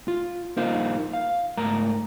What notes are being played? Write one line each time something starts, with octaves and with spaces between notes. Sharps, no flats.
F4
A#3 D#4 F4 A#4 C5 F5
F5
G#2 A3 A#4 A#5